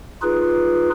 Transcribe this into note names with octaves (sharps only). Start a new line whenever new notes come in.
D#4 F4 G#4 B4